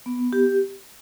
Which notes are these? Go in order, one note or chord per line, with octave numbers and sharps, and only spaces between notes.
B3
G4